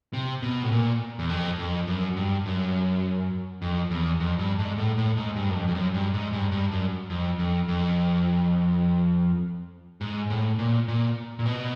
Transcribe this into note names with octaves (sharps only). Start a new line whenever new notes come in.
C3
B2
A2
A#2
E2
F2
F2
F#2
G2
F#2
F2
E2
F2
G2
G#2
A2
A2
G#2
G2
F#2
F2
F2
F#2
G2
G#2
G2
G2
F#2
F2
F2
F2
G#2
A2
A#2
A#2
A#2
B2